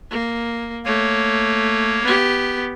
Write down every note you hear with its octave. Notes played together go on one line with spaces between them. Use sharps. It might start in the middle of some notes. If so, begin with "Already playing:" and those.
A#3
A3 A#3 C#5
B3 G4